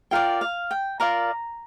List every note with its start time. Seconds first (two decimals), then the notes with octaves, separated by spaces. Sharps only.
0.11 F4 A#4 D5 G5
0.41 F5
0.71 G5
1.00 F4 A#4 D5 A#5